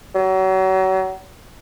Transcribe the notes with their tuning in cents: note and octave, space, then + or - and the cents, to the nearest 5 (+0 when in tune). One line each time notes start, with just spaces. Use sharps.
F#3 +35